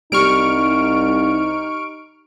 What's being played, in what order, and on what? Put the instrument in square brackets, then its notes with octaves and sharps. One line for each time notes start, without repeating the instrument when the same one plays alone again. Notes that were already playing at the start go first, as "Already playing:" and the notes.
[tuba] C2 [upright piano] G3 [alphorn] D#4 [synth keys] C#6 F6 D7